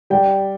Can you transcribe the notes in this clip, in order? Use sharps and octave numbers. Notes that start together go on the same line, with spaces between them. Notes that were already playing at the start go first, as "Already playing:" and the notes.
G3 G5